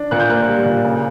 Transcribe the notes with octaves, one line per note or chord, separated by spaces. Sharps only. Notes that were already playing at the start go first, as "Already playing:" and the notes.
Already playing: D4
A#2 F#6
G6
A#3 F#6
G3
A#2
C#3